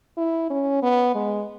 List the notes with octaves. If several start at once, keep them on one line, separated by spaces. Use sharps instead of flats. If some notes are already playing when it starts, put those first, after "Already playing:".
E4
C#4
B3
G#3